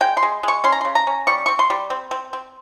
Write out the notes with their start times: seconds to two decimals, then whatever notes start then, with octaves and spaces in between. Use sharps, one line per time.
0.01 G#3 G5
0.17 C6
0.23 G#3
0.43 G#3 C#6
0.64 C#4 C6
0.72 A#5
0.81 C#3 C6
0.95 A#5
1.07 C#4
1.27 G3 C#6
1.46 C4 C#6
1.59 C6
1.70 G3
1.90 C4
2.11 C4
2.33 C4